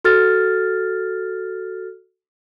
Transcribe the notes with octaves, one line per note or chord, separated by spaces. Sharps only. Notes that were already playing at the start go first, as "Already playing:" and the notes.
F#4 A4 F6 A6